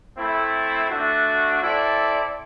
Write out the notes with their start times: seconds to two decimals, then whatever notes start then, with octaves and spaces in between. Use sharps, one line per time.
0.18 A3 C4 E4
0.90 A3 D4 F#4
1.61 C4 E4 A4 D5